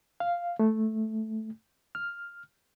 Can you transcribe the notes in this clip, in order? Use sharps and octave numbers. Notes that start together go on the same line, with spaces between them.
F5
A3
F6